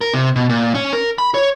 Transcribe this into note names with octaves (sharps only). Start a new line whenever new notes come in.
A#4
C3
B2
A#2
C#4
A#4
B5
C#5